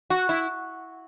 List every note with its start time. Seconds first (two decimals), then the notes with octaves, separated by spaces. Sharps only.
0.10 F#4
0.29 E4